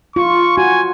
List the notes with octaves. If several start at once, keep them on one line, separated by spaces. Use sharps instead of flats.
F4 C#6
F#4 G#5